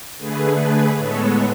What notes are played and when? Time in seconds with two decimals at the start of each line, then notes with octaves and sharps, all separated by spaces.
0.18 D3 A3 G#4 B4
0.58 G#4 B4
0.97 A2 G#3 B3 A4 C#5